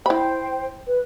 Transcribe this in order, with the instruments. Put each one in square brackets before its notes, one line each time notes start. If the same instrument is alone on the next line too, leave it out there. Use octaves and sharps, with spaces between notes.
[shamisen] E4 B5 [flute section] C5 G5
[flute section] B4